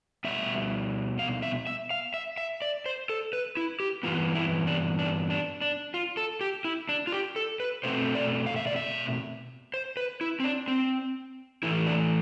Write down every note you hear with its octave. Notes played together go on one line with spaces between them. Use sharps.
B2 G3 B3 E5
F5
E5
E5
F5
E5
E5
D5
C5
A4
B4
E4
G4
G2 E3 B3 F4
E4
D4
D4
D4
D4
F4
A4
G4
E4
D4
F4
G4
A4
B4
B2 A3 C4 C5
D5
F5
E5
D5
E5
C5
B4
E4
C4
D4
C4
A2 E3 A3 E4
D4